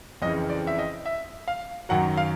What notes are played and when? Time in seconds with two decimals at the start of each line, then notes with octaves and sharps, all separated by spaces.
0.22 F2 C#3 E3 D#5
0.50 D5
0.67 E5
0.79 D#5
1.06 E5
1.48 F5
1.89 F#2 D#3 F#3 F#5
2.17 F5